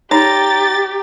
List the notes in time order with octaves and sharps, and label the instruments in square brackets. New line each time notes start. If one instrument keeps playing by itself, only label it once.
[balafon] D#4 C#5 [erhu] G4 [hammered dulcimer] A#5 [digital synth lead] A6